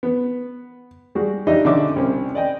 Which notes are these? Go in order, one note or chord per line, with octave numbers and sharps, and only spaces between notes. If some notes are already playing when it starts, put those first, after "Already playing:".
B3
G3 G#3 F#4
D4 D#4 G4 D#5 E5
D3 C#4 E5 D6
C2 C#4
D5 D#5 G5